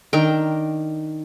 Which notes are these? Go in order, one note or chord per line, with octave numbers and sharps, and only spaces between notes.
D#3 D4 A#4 G5